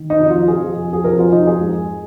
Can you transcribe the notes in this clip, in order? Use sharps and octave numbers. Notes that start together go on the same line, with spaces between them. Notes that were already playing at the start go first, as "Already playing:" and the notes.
Already playing: D#3
D#4
F2
F4
F2 G#4
F2
G#4
F2 A#4
F4
F2 D#4
G#4
G#2